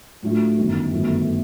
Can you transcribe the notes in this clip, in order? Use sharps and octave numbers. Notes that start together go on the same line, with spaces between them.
A2 F#3 A3 D4 F4
G1 F#2 D#3
G1 F#2 D#3 F#3 A3